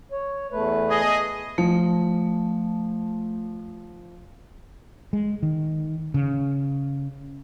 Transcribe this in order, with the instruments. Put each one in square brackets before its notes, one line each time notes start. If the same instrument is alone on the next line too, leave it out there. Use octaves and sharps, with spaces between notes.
[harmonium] C#5
E2 A3 B4
[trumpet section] G#4 D#5
[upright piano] F3 [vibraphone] A3
[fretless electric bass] G#3
D#3
C#3